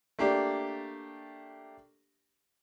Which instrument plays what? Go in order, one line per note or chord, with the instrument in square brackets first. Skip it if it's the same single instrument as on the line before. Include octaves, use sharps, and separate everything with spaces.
[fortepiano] A3 A#3 D4 G4